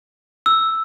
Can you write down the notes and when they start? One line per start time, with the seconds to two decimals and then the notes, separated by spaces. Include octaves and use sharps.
0.46 E6